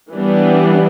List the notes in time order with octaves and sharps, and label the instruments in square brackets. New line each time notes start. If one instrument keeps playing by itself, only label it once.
[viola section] E3 G3 B3 D4